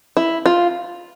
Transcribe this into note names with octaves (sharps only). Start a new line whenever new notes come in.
E4
F4